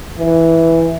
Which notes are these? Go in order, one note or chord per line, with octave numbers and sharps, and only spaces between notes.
E3